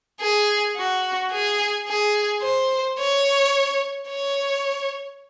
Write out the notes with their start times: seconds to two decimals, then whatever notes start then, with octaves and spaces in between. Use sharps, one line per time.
0.21 G#4
0.76 F#4
1.32 G#4
1.87 G#4
2.42 C5
2.99 C#5
4.09 C#5